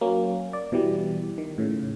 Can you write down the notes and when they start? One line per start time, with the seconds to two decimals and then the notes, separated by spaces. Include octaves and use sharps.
0.01 F#3 A#3 C#4
0.53 D5
0.72 B2 E3 G3
1.38 D#3
1.58 A2 C#3